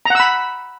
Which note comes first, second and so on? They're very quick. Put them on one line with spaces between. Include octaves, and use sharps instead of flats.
A#5 F#5 E6 B5